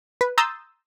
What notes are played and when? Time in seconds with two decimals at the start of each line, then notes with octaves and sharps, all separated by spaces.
0.21 B4
0.38 A#5 C6 D#6 E6 G6 A6